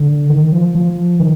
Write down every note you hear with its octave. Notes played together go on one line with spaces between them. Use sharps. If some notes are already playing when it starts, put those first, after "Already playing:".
Already playing: D3
D#3
F3
F3
D#3